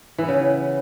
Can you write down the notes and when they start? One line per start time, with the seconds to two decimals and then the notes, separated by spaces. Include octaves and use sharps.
0.18 E3
0.23 B3
0.28 C#3